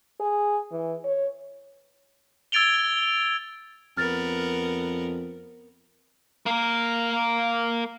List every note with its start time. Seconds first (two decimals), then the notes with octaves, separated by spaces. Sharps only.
0.20 G#4
0.72 E3
1.04 C#5
2.52 E6 G#6 A6 D7 F7 G7
3.97 F2 B3 A#4 F6 A6
6.46 A#3 A#4